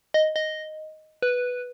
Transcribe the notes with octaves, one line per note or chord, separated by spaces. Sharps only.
D#5
D#5
B4